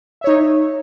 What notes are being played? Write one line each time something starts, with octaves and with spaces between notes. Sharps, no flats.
D#4 C#5 E5